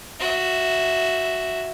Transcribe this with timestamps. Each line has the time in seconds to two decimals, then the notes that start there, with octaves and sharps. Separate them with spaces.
0.19 F#4 E5